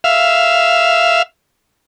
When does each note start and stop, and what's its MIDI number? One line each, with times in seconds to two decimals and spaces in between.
0.04 1.22 76
0.04 1.22 77